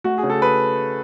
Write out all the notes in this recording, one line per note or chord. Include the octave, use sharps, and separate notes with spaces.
A3 F#4
G#4
C#3
A4
B4